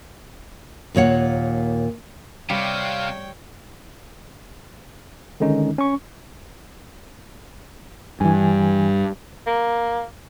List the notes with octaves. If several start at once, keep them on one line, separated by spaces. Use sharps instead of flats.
D#2 A#2 C#5 F#5
C3 G3 C#5 F5 G5
D3 D#3 G#3 C#4 D#4
C#4 C#6
G2 E3 G#5
A#3